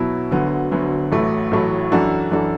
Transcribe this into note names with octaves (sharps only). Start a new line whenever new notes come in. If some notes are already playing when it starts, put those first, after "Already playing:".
Already playing: B2 F#3 B3 E4
D2 D3 F#3 B3
D2 D3 F#3 B3
A1 A2 F#3 A3
A1 A2 F#3 A3
F#2 E3 D4 F#4 A4
F#2 E3 D4 F#4 A4